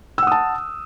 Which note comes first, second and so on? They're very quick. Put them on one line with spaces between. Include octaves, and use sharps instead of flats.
E6 F#5 D#6 A5